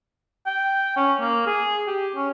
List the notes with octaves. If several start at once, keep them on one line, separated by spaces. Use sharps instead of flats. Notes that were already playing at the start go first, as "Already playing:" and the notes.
G5
C#4
A#3
G#4
G4
C#4